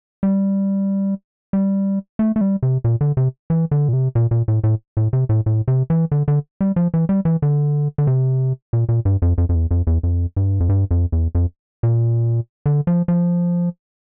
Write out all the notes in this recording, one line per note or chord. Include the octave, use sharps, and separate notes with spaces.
G3
G3
A3
A3
G3
C3
A#2
D3
C3
E3
D3
A#2
C3
A#2
A#2
A2
A2
A2
C3
A2
A2
C3
E3
D3
D3
G3
F3
E3
G3
E3
D3
D3
C3
A#2
A#2
G2
F2
F2
F2
E2
F2
E2
F2
G2
F2
G2
F2
E2
F2
A#2
D3
F3
F3